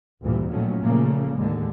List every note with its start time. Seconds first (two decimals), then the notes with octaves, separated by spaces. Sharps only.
0.22 G#1 D2 G2 A#2 E3 G3
0.51 A#2 D#3 F3 F#3 A3 C#4
0.81 A#2 C#3 F3 A3 A#3
1.37 D#2 A2 D3 G#3